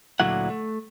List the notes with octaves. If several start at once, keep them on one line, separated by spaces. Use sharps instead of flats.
D2 A#2 D3 F#3 E4 F#5
A3